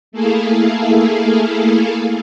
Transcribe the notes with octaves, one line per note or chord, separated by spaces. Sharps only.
A3 A#3 E4 G#4 A4 F5